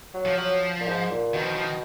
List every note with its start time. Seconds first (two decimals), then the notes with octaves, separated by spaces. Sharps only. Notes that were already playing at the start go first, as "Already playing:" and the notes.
0.14 F#3
0.25 F3
0.37 F#3
0.81 A#2
0.86 G#2
1.10 A#2
1.34 B2 D#3
1.41 F3
1.49 D#3
1.56 F3
1.63 D#3